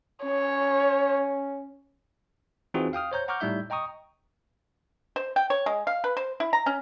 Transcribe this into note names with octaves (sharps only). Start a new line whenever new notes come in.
C#4 C#5
E3 C4 D#4 F4 F#4 G#4
F5 G5 D#6 F6
C5 C#5 A#5 G6
F#5 A#5 C#6 D6 F6 G6
A2 G3 D#4 E5 G6
D#5 G5 A#5 C#6 D#6
C5
G5
C#5
G#3
F5
B4
C5
E4
A#5
C#4